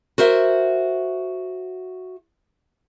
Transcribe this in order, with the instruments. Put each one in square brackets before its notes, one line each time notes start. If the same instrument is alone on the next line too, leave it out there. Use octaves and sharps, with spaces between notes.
[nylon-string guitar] F#4 A#4 C5 E5